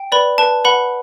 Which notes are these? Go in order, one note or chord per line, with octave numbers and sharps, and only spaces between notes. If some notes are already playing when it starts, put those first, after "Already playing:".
Already playing: G5
B4 D5 B5
B4 A5
B4 F#5 B5